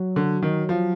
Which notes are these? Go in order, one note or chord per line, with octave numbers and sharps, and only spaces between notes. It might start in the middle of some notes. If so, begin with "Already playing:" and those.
Already playing: F#3
D3
D#3
F3